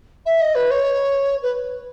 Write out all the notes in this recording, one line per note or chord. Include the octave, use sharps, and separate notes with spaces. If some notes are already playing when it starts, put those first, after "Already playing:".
E5
D#5
B4
C#5
B4